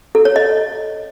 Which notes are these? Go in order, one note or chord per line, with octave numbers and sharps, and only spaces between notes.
A4
C#5
D#5